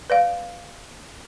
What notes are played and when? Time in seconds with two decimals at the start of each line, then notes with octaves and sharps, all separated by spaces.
0.10 B4 D5 F5